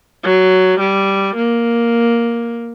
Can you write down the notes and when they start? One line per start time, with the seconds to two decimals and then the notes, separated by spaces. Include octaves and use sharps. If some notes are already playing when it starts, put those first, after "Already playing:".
0.24 F#3
0.79 G3
1.36 A#3